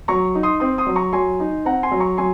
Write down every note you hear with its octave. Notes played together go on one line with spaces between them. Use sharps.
F#3 A#5 C#6
D#4
C6 D#6
C4 C6 D#6
C6 D#6
F#3
A#5 C#6
F#3 G#5 C6
D#4
C4 F#5 A#5
G#5 C6
F#3
A#5 C#6
F#3 G#5 C6